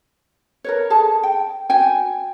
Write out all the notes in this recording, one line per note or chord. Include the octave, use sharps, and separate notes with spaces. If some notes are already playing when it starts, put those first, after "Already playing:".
A#4 B4 C#5
G#4 A4 A5
G5
F#4 G5 G#5